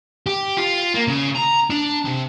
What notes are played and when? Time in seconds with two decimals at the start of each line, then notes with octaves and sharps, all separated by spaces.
0.26 G4
0.57 F4
0.95 A#3
1.08 C#3
1.36 A#5
1.70 D4
2.05 C3